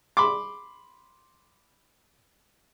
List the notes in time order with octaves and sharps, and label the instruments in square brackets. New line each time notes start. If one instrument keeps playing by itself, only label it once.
[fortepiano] B5 C6 D6